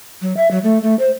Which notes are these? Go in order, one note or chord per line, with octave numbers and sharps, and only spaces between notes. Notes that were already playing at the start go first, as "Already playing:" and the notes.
F#3
E5
F#3
A3
A3
C5